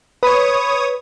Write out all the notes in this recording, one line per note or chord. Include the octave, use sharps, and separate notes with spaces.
B4 C#5 B5 D#6